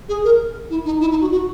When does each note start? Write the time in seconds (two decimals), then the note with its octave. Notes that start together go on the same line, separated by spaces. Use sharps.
0.09 G#4
0.24 A#4
0.70 E4
0.85 D#4
1.01 E4
1.11 D#4
1.21 F#4
1.32 F#4